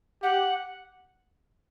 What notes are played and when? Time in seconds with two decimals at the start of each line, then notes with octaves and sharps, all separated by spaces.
0.23 G4 F#5